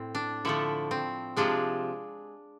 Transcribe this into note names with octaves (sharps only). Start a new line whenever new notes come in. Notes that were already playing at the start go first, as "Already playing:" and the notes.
Already playing: A2 C4
D4
D3 F3 A3 E4
C4
C3 F3 G#3 D4